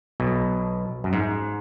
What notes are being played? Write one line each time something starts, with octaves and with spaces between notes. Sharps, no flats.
B1 B2
F#2
G#2